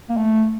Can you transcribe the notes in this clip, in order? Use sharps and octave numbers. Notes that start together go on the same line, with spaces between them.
A#3
A3